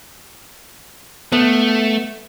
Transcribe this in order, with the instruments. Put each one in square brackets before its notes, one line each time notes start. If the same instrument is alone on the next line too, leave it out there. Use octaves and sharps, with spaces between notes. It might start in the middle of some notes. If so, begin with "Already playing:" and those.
[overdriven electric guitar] A3 [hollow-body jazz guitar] B3